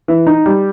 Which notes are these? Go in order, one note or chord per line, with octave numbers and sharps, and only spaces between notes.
E3
D#4
G3